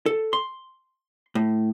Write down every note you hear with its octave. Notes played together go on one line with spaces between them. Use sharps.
A4
C6
A2